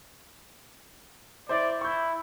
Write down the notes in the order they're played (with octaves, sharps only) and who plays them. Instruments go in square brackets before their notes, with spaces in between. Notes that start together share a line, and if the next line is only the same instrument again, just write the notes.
[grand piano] E4 C5 [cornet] D5
[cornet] E4 [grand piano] C#6 G6